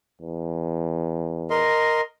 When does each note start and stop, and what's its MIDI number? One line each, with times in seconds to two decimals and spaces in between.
0.22 1.71 40
1.50 2.01 70
1.50 2.01 75
1.50 2.01 84